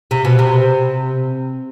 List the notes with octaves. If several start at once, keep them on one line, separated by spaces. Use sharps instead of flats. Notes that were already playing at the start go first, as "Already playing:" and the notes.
C3
B2
C3